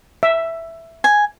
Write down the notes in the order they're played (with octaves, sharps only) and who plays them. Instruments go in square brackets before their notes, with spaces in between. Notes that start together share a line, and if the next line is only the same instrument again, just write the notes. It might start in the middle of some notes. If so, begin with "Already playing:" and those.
[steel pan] E5
[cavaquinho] G#5